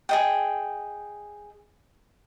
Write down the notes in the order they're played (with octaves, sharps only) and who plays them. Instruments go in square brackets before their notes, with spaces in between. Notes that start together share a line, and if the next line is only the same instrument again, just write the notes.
[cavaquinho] G#4 D#5 G5